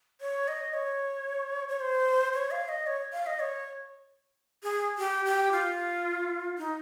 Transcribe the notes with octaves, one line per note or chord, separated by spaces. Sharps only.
C#5
D#5
C#5
C#5
C5
C#5
F5
D#5
C#5
F5
D#5
C#5
G#4
G4
G4
F4
D#4